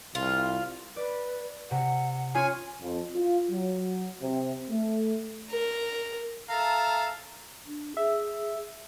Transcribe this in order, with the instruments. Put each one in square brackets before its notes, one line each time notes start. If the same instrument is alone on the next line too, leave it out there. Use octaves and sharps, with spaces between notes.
[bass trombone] C2 [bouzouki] F4
[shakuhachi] B4 [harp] D5
[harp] C3 [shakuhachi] F#5
[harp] C#4 F4 C#5 [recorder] G#5
[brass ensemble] F2
F4
F#3
C3
A3
[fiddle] A#4
[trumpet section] A4 E5 F5 A5 A#5
[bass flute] D4
[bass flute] G#4 [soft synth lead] E5